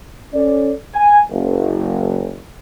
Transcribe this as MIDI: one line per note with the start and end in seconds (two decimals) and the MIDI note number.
0.34 0.73 61
0.34 0.73 69
0.34 0.73 74
0.94 1.19 80
1.30 2.37 30